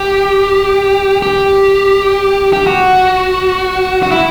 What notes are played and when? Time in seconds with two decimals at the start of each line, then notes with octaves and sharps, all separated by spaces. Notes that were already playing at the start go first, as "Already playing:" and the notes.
Already playing: G4
1.22 G4
2.53 G4
2.67 F#4
4.03 F#4
4.11 E4